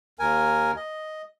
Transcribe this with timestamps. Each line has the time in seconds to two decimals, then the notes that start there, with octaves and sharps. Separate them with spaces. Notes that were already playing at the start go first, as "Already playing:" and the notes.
0.19 D#2 A#4 G#5
0.76 D#5